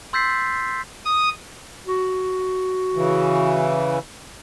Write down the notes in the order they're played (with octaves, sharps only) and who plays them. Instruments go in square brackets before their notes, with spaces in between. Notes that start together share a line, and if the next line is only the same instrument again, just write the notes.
[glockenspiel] C6 E6 G6 A6 B6 C7
[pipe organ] D#6
[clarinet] F#4
[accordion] C#3 E3